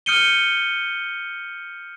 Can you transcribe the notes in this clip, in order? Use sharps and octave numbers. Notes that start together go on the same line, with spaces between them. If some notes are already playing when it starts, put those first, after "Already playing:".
D#6 F6 G6 C#7 D#7 G7